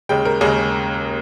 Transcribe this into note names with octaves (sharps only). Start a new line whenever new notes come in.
D#2 C#3 G#3 G5
A#4
D#2 C#3 G#3 G#4